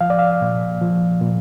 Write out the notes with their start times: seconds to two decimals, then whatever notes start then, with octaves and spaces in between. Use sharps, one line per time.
0.01 F3 F5
0.10 D5
0.19 F5
0.41 A#2
0.81 F3
1.22 A#2